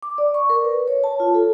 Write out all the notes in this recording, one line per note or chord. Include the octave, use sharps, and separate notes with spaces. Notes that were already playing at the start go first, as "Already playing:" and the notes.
D6
D5
C#6
A#4
B4
C#5
A5
F4
A4